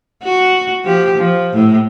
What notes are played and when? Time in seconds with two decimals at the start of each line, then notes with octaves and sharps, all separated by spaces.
0.23 F#4
0.84 F3 G4
1.18 F3
1.54 A2